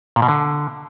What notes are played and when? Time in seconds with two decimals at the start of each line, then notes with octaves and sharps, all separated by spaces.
0.16 A#2
0.22 B2
0.28 D3